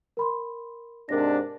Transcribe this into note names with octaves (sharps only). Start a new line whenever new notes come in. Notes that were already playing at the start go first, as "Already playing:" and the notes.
A#4 B5 C6
G#2 C3 D4 A#4 D5 A#6